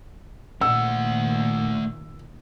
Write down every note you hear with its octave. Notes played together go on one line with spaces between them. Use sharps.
A#1 A#2 D#3 A3 F#5 E6